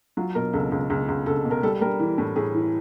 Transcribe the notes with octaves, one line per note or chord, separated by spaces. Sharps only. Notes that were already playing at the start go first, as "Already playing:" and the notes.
F#3 F4
B2 A#4
C#2 A4
C#2
C#2
C#2
C#2 A4
B2
A#4
G3 A4
G3 A#4
E3
A2
A2 G#4
E3